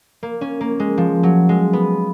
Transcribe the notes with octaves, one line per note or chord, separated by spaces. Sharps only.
A#3
C#4
A#3
G#3
F3
F#3
G#3
B3